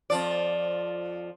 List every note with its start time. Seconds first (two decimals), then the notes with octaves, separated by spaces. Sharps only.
0.10 F2 F3 D5